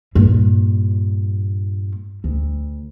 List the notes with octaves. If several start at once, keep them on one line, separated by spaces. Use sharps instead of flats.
G2 A#2
D2